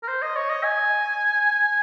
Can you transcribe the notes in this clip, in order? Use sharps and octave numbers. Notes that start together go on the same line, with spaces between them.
A#4
C5
D#5
C#5
D#5
G#5